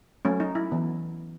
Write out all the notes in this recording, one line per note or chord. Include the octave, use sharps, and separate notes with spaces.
F#3 A3 C#4
D#4
E4
E3 B3